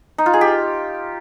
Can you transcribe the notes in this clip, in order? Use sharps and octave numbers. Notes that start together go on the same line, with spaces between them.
D#4
F4
G#4
G4